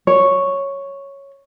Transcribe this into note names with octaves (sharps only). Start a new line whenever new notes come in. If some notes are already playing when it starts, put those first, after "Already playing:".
C#5